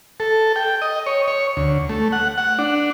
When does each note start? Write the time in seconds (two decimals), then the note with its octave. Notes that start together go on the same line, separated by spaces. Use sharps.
0.20 A4
0.56 G5
0.82 D#5
1.06 C#5
1.28 C#5
1.57 D2
1.89 A3
2.12 F#5
2.38 F#5
2.59 D4